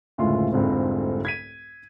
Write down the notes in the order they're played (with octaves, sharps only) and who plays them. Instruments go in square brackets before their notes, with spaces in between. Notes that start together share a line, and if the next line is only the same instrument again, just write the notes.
[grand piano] F#1 D2 A2 G#3 F4 C6
F1 C2 G#2 D3 C4 F4
G#6 B6 D#7